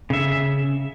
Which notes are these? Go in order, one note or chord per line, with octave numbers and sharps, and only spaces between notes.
C#3 E5